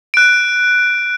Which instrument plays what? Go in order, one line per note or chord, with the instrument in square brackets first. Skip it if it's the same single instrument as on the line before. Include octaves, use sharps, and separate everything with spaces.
[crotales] F#6 D7